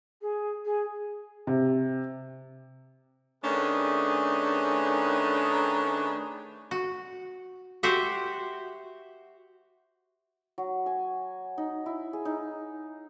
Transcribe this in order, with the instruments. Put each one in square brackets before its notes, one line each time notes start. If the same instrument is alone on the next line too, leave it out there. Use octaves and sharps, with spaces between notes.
[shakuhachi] G#4
G#4
[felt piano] C3
[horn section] D#3 A3 C#4 D4 G#4 B4
[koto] F#4
F#4 G4 C5 E5 F#5
[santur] F#3
G#5
D#4
E4
G#4
D#4